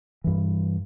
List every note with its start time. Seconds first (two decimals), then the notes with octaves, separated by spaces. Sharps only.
0.24 G2 E3